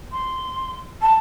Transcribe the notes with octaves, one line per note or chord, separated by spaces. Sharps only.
C6
A5